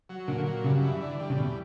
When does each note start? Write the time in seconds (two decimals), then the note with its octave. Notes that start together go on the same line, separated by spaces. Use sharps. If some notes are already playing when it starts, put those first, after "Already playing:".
0.09 F#3
0.28 A#2 D3
0.46 F#3
0.64 G2 C#3
0.82 E3
1.01 D3
1.19 G3
1.30 C#3
1.37 E2 B2